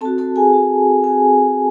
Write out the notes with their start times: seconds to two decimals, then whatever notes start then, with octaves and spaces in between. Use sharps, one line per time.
0.01 C4 F#4 A4 A5
0.18 A4 A5
0.36 G#4 G#5
0.53 C4 F#4
1.04 C4 F#4 G#4 G#5